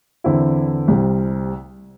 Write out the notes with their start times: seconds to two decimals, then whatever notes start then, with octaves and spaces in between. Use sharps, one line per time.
0.24 E2 D3 C4 E4
0.88 C2 C3 G3